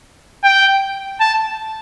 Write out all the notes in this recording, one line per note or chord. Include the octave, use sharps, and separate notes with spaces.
G5
A5